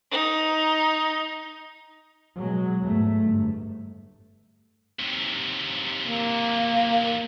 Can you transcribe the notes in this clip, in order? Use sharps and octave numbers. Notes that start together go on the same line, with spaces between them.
D#4
B2 F#3 G#3
E2 G#2 A3
G1
D#2 C3
A#3